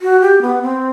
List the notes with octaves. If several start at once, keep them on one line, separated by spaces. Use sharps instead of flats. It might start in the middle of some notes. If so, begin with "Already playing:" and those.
F#4
G4
B3
C4